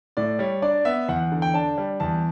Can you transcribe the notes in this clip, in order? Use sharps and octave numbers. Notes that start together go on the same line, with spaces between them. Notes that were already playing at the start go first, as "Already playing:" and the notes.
A2 D5
G3 C#5
D4 D5
B3 E5
E2 F#5
D3
G5
D4 A5
G3
E2 A5